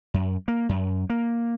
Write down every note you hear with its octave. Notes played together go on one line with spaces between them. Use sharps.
F#2
A#3
F#2
A#3